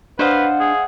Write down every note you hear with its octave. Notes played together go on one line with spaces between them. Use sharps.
D4 B4 C5 D#5 F5 F#5
G#4